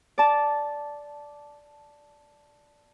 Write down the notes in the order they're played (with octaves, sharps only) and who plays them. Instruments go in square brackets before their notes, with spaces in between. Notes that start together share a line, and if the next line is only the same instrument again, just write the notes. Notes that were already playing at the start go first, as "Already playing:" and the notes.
[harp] D5 A5